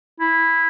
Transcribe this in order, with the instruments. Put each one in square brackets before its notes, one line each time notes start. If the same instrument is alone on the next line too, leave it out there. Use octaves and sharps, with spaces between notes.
[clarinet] E4